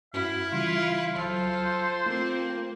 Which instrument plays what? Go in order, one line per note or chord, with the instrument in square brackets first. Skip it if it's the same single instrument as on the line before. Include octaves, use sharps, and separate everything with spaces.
[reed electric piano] G2 C#4 F#4 [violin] E4 [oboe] F5
[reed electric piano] C#3 E3 G3 [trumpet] F4
[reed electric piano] C#2 F#3 F6 [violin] F4 [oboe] A4 [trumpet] C5
[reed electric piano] A3 F4 [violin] A#3 C4